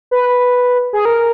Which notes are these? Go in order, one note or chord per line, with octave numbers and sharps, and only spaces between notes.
B4
G#4
A#4